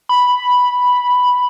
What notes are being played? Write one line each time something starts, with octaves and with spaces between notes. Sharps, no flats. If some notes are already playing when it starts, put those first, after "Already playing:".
B5